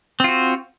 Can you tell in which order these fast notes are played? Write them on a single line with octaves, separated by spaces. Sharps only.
C4 F4 F#4